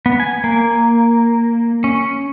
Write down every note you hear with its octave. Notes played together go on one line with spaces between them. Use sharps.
B3
G#5
A#3
C#4